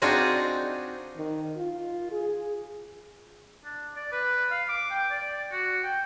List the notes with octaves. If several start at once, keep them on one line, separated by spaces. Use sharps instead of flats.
C4 D4 D#4 F4 F#4 G#4
D#3
F4
G#4
D4
D5
B4
F5
D6
G5
D5
F#4
G5